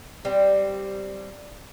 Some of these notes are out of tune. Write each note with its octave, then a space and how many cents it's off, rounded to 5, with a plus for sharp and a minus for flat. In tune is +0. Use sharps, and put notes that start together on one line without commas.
G3 -5 C4 +0